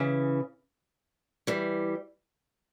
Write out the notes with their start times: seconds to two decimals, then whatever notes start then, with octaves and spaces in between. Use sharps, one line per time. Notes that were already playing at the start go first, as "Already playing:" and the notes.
Already playing: C#3 E3
1.47 E3 G3